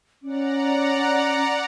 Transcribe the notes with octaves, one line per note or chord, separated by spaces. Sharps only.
C#4 D5 F#5 A#5